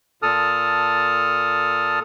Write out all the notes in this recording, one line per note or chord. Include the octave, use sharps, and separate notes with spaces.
A#2 A4 A5 D#6 F6